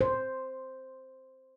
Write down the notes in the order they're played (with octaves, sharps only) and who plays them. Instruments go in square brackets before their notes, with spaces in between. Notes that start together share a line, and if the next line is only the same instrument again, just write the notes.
[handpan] C5